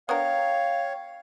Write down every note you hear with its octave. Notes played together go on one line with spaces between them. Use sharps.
B3 D4 A#4 C#5 F5 G5